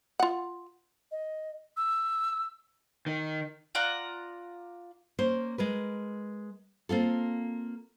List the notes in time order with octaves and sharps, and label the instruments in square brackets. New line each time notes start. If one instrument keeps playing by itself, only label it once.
[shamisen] F4 F#5
[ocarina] D#5
[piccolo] E6
[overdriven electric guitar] D#3
[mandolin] F4 D5 F#5 A#5
[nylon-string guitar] A#3 C#4 C5
G#3 A#4 B4
A#3 C4 F4 A4